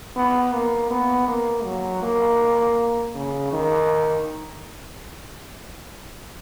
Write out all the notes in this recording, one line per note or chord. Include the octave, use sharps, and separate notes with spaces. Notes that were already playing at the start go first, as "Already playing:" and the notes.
B3
A#3
B3
A#3
F#3
A#3
C#3
D#3